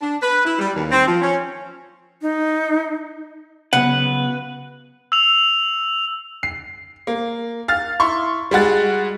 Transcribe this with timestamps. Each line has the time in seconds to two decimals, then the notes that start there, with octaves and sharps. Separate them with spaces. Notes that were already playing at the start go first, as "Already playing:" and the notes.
0.01 D4
0.22 B4
0.45 E4
0.59 G3
0.75 D#2
0.92 C4
1.07 F3
1.21 C#4
2.22 D#4
3.73 C#3 F#3 B3 B4 F#5
5.12 E6 F7
6.43 C7
7.07 A#3
7.68 F5 F6 A6
8.00 E4 C6 C#6
8.51 G3 G#3 F#4 A6